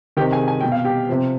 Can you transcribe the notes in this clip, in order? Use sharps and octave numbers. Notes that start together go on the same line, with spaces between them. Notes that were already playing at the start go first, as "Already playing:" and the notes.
C3 D#3 G4 G5
G#4 G#5
G#5
B2 G5
F5
G4 G5
C3 F3